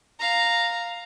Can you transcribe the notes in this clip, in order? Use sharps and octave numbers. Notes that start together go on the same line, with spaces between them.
F5 A#5